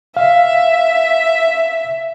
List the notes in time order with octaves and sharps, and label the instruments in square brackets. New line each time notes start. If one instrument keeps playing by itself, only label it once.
[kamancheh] E5 [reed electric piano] F5